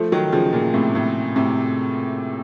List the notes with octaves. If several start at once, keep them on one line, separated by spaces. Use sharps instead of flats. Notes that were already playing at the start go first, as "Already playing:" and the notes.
Already playing: F3 A3
D#3 F#3
C#3 F3
A#2 C#3
A2 C3
A2
A2 C3